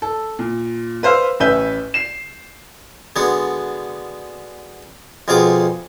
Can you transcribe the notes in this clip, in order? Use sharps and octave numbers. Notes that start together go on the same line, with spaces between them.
A4
A#2
B4 C5 F5 E6
A1 C#4 B4 E5 G6 G7
C7 E7
D3 G#3 B3 D4 F#4
F2 B2 G#3 F4 G#4 D6